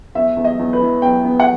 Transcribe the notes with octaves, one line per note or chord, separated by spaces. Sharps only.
E2 E5
E2
D#5
E2
B4
E3
B3 G5
B3
F#5